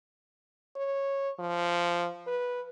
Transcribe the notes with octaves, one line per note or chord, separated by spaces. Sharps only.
C#5
F3
B4